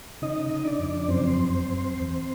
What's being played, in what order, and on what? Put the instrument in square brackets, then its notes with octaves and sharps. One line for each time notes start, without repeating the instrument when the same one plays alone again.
[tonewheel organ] C#3 D#4 D#5
C#3
D4 D5
F2
F#2 C4 C5
F#2
F#2
E2